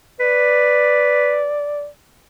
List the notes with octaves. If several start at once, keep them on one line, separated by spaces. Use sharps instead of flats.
B4 D5